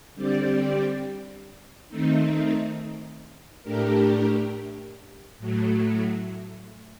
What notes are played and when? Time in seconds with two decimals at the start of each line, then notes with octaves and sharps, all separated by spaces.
0.15 D3 G3 C4 G4 D5
1.89 D#3 A3 C4 D#4
3.63 A2 A3 D4 G4 A#4
5.38 A2 F#3 A3